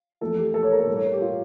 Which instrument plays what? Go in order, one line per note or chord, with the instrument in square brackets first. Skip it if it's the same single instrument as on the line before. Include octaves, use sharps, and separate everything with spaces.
[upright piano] F2 E3 A3 A4
G4
A4
C#5
A#4
A4
A2 G3
C#5
A#4
G4
F4